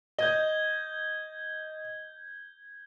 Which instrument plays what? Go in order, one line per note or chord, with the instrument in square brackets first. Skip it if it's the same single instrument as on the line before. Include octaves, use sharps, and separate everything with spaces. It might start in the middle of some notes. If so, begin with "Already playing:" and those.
[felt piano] D#5 [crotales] G6 G#6 G7